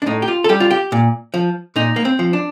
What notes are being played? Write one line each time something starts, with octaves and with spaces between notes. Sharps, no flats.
D4
A2 D#4
G4
F4
A4
G3 G4
F4
G4
A#2
F3
A#2 D#4
A#3
C4
F3
D4